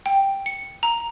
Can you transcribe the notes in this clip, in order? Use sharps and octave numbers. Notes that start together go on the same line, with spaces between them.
G5
C#7
A#5